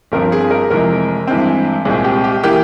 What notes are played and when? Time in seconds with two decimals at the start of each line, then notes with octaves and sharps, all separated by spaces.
0.12 G1 G2 F3 C4 A#4
0.32 G#4
0.51 A#4
0.70 F1 F2 C3 E3 G#3 A#4
1.27 G2 E3 G#3 C4
1.85 C2 A#2 G#3 C4 G#4
2.04 G4
2.24 G4
2.43 E3 A#3 G4